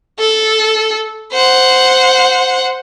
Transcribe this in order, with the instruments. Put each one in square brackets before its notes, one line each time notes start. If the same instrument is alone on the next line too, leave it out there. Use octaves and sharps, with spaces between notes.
[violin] A4
C5 F#5